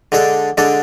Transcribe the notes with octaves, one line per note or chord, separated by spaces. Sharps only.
D3 G#3 D4 A4
D3 G#3 D4 A4